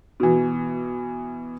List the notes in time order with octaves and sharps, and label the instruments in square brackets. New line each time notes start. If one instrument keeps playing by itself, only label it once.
[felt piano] B2 E3